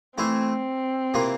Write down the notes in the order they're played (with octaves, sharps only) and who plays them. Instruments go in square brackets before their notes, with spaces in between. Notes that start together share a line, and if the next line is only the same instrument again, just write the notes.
[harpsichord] E3 A3 E4 A4 C5 [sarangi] C4
[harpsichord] C3 E3 A#3 F4